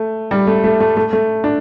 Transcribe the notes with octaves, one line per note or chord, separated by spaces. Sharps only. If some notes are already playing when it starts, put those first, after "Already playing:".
Already playing: A3
G3
A3
A3
A3
A3
A3
D4